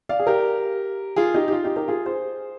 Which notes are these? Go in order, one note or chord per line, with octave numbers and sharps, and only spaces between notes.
D5 F5
G#4
G4 A#4
F4 G#4
D#4 G4
G4
F4
D#4 G4
G4 A#4
F4 G#4
G#4 C5